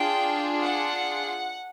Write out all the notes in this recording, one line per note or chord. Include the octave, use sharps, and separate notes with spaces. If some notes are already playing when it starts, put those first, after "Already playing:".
Already playing: D4 F4 G#4 G5
F#5